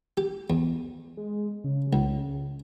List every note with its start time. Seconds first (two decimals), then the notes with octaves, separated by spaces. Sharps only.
0.17 G4
0.50 E2
1.17 G#3
1.64 C#3
1.93 C#2